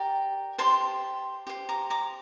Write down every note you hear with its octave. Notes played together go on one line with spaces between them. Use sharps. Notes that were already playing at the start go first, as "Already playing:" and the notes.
Already playing: G4 A#4 D5 G5 A#5
G4 C5 A5 C6
G4 C5
A#5 D6
A#5 D6